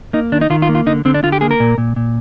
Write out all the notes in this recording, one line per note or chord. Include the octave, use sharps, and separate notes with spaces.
A#3 D#4
D#3 D4
D#4
D#3 F4
F4
A#3
F4
D3 D#4
D3 C4
D4
D3 F4
G4
A#3 G#4
A#4
A#2
A#2
A#2